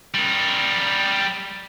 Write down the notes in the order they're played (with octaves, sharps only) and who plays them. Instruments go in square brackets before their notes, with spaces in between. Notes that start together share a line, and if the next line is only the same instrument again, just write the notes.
[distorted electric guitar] G3 A#4